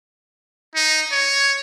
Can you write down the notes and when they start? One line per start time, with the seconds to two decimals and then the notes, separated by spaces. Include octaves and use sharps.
0.75 D#4
1.12 C#5